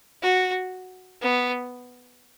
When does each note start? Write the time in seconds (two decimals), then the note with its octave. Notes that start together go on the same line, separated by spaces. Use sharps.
0.23 F#4
1.22 B3